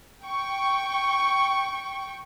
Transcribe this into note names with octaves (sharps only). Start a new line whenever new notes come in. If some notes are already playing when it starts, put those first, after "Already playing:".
G5 C#6